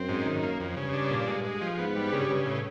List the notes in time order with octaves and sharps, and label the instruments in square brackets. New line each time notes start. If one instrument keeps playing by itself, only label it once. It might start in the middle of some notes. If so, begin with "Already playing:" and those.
Already playing: [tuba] F#2 [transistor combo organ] C4
[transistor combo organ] G#2
D#3
A#3
F2
[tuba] G2 [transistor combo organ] C#3
[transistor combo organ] D4
A#2
G#3
G#3
F3
[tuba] G#2 [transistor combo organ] B3
[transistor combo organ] G3
[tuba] G2 [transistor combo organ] C#3
[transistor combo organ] C#3
A2